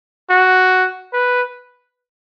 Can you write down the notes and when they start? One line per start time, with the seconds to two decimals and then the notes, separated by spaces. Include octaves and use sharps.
0.30 F#4
1.13 B4